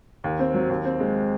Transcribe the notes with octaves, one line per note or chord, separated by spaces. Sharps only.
D#2
C4
F#3
D#2
C4
G#3